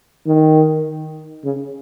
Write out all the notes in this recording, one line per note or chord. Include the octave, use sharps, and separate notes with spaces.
D#3
C#3